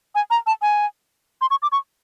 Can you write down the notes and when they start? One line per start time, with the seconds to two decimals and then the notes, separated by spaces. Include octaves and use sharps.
0.15 G#5
0.30 A#5
0.47 A5
0.62 G#5
1.41 C6
1.51 C#6
1.62 D6
1.72 C#6